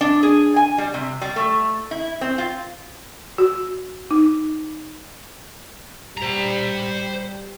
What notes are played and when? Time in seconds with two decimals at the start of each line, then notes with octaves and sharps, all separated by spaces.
0.01 D4
0.23 G#4
0.56 G#5
0.78 G3
0.94 C3
1.21 G3
1.36 A3
1.91 E4
2.21 C4
2.38 F4
3.38 F#4
4.11 D#4
6.18 G3 C5 A#5